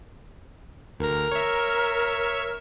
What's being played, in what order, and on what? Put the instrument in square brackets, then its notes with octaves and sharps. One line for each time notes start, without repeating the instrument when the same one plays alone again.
[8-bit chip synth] D2 A#5 [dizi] A#4
[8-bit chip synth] C#5 E5